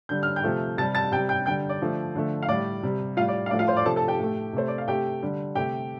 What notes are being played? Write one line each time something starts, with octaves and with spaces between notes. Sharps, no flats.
D3 G3 G6
F6
G5 G6
C3 F3 A3
C3 G3 A5 A6
A5 A6
C3 G3 G5 G6
G5 G6
D3 G3 G5 G6
D5
D3 F3 A3
D3 F3 A3
F5
A2 G3 D5
C3 G3
A2 G3 F4 F5
D5
F5
A2 F3 A3 D5
F4 F5
C5 C6
D5 D6
C3 F3 A3 A4 A5
A4 A5
G4 G5
A2 A3
C3 A3 C5
D5
F5
C3 A3 G4 G5
D3 G3
C3 A3 G4 G5